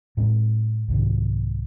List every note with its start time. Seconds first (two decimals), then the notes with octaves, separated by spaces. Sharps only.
0.17 A2 G#3 C4
0.88 C2 G#2 D#3